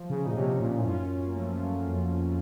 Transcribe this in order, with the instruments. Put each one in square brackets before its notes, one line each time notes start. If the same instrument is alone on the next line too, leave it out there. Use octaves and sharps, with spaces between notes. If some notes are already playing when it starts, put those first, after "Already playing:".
Already playing: [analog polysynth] F3
[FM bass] C#3
[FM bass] A#2 [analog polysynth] D#4
[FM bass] C3 [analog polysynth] A#3 C#4
[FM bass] A#2
A2
[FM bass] F#2 [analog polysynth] C#4 F4
[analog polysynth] A#3
F3 A3
F#3
[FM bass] F2